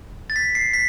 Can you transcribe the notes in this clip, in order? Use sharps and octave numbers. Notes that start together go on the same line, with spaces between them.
A6
B6
C7
B6